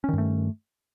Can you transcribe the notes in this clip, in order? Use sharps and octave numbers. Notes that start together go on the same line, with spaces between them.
G2 D#3 A3 C#4